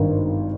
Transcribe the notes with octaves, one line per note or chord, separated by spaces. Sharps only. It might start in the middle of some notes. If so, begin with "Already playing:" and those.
Already playing: G#1 G2 D#3